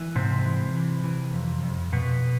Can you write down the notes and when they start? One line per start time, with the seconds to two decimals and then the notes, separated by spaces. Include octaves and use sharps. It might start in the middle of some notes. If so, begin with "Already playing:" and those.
Already playing: E3
0.15 G#2 C3 C4
0.45 E3
0.75 E3
1.04 E3
1.34 F2
1.63 F2
1.92 F2 B2 B3